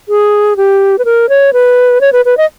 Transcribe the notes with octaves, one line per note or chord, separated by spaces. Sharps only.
G#4
G4
B4
A#4
C#5
B4
C#5
B4
B4
D#5